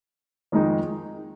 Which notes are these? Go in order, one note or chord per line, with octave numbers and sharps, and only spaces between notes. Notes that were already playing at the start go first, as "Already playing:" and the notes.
F2 D#3 G#3 D#4